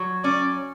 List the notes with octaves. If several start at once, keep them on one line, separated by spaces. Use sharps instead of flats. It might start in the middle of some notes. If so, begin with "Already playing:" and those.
Already playing: F#3
C#4 D5